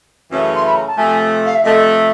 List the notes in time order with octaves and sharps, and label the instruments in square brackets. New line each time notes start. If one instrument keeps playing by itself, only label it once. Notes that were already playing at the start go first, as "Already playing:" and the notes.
[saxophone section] F#2 C#3 E3 A3 C#4
[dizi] C6
B5
A#5
A5
[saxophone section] C3 F3 A3 [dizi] G#5
[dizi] F5
E5
[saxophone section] C3 F3 A3 [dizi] D#5